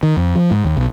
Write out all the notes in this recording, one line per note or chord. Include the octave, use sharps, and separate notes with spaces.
D#3
F2
F3
G#2
D#2
B1